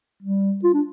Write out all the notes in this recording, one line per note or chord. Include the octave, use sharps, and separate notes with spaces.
G3
F4
D4